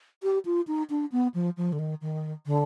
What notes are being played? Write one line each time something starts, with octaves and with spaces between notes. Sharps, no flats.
G4
F4
D#4
D4
B3
F3
F3
D3
D#3
D#3
D3